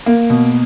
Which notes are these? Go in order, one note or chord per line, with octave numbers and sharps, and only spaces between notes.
A#3
B2